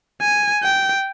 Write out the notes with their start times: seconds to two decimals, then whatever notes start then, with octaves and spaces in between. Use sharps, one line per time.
0.21 G#5
0.63 G5